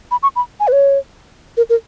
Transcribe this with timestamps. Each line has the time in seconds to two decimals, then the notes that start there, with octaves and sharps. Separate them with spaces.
0.11 B5
0.23 C#6
0.36 B5
0.60 G#5
0.68 B4
0.72 C#5
1.57 A#4
1.70 A#4